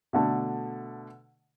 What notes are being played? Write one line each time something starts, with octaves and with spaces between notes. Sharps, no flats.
B2 D3 A3